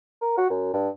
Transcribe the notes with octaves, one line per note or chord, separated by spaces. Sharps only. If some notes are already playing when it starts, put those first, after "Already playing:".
A#4
F#4
F#2
G2